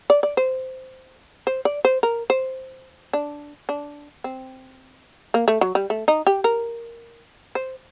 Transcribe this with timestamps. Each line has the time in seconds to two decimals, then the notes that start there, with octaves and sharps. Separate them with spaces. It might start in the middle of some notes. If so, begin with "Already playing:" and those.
0.10 D5
0.23 D5
0.37 C5
1.47 C5
1.65 D5
1.85 C5
2.03 A#4
2.30 C5
3.13 D4
3.69 D4
4.24 C4
5.34 A#3
5.48 A3
5.61 F#3
5.75 G3
5.90 A3
6.08 D#4
6.27 G4
6.44 A#4
7.55 C5